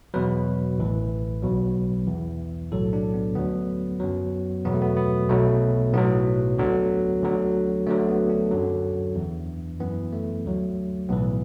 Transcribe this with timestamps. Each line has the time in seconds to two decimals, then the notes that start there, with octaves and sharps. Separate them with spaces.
0.14 E2 B2 F#3 B4
0.79 A1 A2 E3
1.43 B1 B2 F#3
2.08 E2 E3
2.72 B1 A2 F#3 A4
2.93 D4
3.14 B3
3.35 D2 D3 F#3 B3
4.00 F#2 F#3
4.65 E2 B2 F#3 B3
4.73 A3
4.82 B3
4.97 B3
5.29 B1 B2 F#3 A3
5.93 B1 A2 F#3 B3
6.58 D2 D3 F#3
7.22 D2 D3 F#3
7.87 D2 D3 F#3 A3
8.09 B3
8.30 D4
8.51 F#2 D3 F#3
9.15 E2 E3
9.80 F#2 E3 B3
10.13 A3
10.45 D2 D3 F#3
11.09 B1 A2 E3 B3